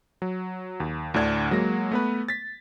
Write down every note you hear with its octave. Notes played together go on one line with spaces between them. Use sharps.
F#3
D#2
D2 A2 D3 D4 G#6
F#3 G#3 A#3 A#6
A3 B3 B4
A6 B6